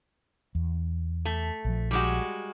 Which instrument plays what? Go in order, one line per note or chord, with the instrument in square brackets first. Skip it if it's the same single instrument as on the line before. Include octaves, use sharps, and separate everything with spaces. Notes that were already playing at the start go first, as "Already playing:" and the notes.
[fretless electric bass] E2
[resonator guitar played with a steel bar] A3
[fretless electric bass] A#1 F3
[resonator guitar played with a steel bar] G3 G#3 F#4